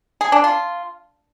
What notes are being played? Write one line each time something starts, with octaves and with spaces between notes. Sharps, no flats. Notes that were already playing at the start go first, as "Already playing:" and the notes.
G#4
D4
F4